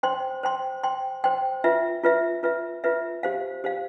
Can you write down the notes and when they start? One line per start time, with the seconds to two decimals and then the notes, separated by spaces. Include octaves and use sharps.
0.03 C5 G5 C6
0.43 C5 G5 C6
0.83 C5 G5 C6
1.24 C5 G5 C6
1.64 F4 B4 E5
2.04 F4 B4 E5
2.43 F4 B4 E5
2.84 F4 B4 E5
3.23 G4 C5 F5
3.64 G4 C5 F5